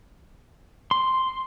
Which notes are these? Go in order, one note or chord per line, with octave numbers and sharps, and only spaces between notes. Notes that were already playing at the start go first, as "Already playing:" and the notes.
C6